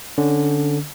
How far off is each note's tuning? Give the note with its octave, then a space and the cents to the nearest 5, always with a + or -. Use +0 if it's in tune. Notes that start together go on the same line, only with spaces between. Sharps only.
D3 +0 C#4 +10